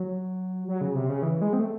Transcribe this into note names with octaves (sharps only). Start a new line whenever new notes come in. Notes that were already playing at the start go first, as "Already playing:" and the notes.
Already playing: F#3
F#3
C#3
C3
C#3
E3
G#3
C4
A3